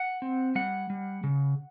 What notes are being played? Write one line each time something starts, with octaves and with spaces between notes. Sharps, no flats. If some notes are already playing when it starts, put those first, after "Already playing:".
Already playing: F#5
C4
G3 F#5
G3
C#3